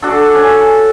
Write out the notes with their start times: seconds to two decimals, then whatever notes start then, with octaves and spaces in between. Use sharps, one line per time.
0.02 D4 F#4 A4
0.35 C#4